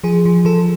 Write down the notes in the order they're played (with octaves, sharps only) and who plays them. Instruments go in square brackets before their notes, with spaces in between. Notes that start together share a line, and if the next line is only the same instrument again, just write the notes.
[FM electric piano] F3 G#4
F3
F3 A4